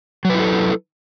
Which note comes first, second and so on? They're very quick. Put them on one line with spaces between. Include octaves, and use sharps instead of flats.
F#3 B4 E4 A4